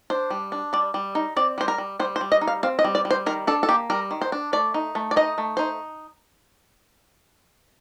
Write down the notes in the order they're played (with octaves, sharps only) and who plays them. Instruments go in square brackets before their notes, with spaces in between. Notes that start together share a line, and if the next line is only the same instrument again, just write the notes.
[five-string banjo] D4 C5
G3
D4
G3 D5
G3
D#4
C4 D5
G3 C5
A#4
G3
G3 C5
C5
G3
D#5
D#4
F5
C4 F5
D#5
G3
D5
G3
C5
D#3 A#4
D4 A4
A4
A#3 G4
G3 A#4
D#3
C5
D4
A3 D5
D#4
A3
D5
D#4 D#5
A3
D#4 C5